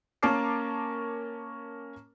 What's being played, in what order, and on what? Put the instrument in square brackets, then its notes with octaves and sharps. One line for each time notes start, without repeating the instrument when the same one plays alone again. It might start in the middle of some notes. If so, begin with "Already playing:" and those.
[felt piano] A#3 C#4 A#4 A5 D6 C7